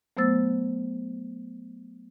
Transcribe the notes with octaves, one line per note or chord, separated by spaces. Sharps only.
F#3 A3 B3 C5 E6 A6